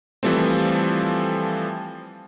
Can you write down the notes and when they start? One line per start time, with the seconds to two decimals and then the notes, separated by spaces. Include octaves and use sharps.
0.23 E3 F3 G3 A3 C4